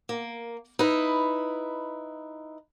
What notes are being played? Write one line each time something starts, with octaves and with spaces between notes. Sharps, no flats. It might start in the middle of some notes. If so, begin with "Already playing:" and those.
A#3
D#4 E4 B4